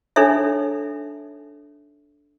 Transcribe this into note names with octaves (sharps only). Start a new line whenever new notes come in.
D4 D#4 A4 C#5 E5